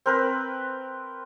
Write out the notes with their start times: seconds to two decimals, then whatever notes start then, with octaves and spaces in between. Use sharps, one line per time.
0.06 C4 A#4 B4